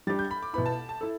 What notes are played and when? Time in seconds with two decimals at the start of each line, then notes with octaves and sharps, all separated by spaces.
0.07 G3 D4 G4 A6
0.19 G6
0.31 B5
0.43 D6
0.53 B2 B3 E4 B5
0.66 A5
0.89 A5
1.01 E4 A4